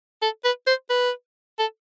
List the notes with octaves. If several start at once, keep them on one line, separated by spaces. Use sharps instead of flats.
A4
B4
C5
B4
A4